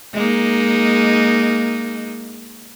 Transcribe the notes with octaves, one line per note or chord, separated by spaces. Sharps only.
G#3 A#3 D#4